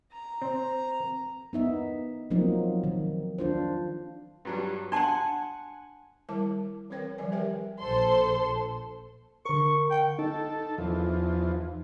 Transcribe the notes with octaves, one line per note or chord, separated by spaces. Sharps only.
A#5
C4
B3 D#4 E5
F3 F#3 A#3 C4 D#4
D#3
D4 F4 C5
G2 F#3 G3
D4 F#5 G#5 A5 C6
D#3 G3 E4 A#4 A5 D6
E3 C4 A#4 B4 C#5 G5
D#3 F3 G3 D5 G#5
G4 A#4 B4 C#5 E5 G5
A#1 A4 C5 C6
D3 A#4 C#6
G5
D#4 A4
E2 F3